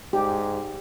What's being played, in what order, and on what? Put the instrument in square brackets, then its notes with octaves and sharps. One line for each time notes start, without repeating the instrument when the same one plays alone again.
[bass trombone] G#2 [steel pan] G4